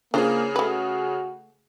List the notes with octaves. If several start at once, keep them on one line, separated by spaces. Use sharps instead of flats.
C#3 A#3 D4 F4 G#4 C5
A3 F#4 B4